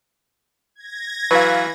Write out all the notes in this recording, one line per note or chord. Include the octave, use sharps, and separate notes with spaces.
G#6 A#6
E3 F#3 B4 F5